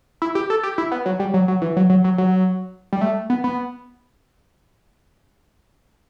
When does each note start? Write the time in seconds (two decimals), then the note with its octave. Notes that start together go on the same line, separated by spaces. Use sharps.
0.22 E4
0.35 G4
0.50 A4
0.63 G4
0.78 E4
0.92 B3
1.06 F#3
1.20 G3
1.34 F#3
1.48 F#3
1.62 E3
1.76 F#3
1.90 F#3
2.04 F#3
2.18 F#3
2.93 G3
3.01 A3
3.30 B3
3.44 B3